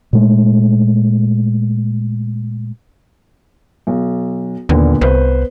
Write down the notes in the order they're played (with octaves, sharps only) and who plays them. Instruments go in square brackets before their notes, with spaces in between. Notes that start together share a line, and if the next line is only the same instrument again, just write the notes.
[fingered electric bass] A#2 G#3 A3
[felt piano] B1
[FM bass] D#2 [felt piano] A#2 D3 B3
[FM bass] C2 [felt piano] B3 B4 C5